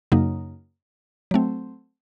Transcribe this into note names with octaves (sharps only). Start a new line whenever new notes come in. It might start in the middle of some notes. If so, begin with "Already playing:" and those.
F#2 C#3 F#3 A#3 D#4
F#3 A3 C4